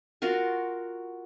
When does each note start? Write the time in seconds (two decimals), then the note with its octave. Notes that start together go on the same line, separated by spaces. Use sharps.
0.22 F4 F#4 A#4